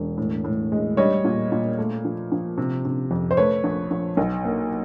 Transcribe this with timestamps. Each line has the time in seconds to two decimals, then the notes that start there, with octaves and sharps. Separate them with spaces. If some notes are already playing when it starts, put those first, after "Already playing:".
Already playing: E1
0.18 A2
0.44 A2
0.72 G#3
0.97 G3 C#5 D#5
1.24 A#2
1.52 A#2
1.78 A3
2.05 F3
2.32 F3
2.58 C3
2.85 C3
3.11 F2
3.31 C5
3.37 A3 B4 C#5
3.64 A#1
3.91 A#1
4.17 B1
4.45 A#3